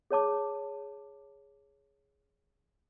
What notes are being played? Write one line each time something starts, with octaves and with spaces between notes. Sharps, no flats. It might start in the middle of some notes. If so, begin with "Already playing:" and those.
G#4 C#5 A5 D6